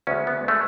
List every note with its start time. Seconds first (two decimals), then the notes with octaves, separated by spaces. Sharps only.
0.07 D2 C#3 G#3 C#4
0.27 B3
0.48 C#3 G#3 A3